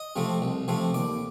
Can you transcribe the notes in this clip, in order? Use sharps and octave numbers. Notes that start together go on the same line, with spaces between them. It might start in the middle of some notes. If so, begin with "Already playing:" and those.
Already playing: D#5
C3 F3 A3 C4
C2
C3 F3 A3 C4
D#2 D5